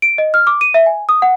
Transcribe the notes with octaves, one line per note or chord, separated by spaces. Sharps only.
D7
D#5
F6
D6
D#7
E5
G#5
D#6
F#5